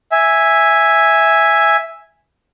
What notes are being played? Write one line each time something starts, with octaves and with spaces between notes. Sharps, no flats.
E5 G#5